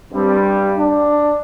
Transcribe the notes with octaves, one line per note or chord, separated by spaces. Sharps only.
G2 G3 C4
D4